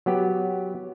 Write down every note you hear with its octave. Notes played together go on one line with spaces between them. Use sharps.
F#3 B3 G4